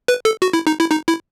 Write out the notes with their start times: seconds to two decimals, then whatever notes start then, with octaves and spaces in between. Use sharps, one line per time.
0.08 B4
0.25 A4
0.42 F#4
0.53 E4
0.67 D#4
0.80 E4
0.91 D#4
1.08 E4